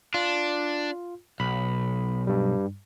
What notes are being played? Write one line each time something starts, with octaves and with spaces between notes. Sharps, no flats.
D4 F4
B1 B5
G2 G3